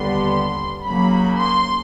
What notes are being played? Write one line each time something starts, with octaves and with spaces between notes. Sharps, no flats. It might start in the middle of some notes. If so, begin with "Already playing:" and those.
Already playing: D#2 D3 G3 B3 C6
C#3 F#3 A#3 B5
C6